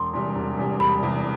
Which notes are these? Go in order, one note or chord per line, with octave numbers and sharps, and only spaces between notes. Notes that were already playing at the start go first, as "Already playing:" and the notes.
Already playing: E1 C6
E2 C3 G3
E1
E2 C3 G3
E1 B5
E2 C3 G3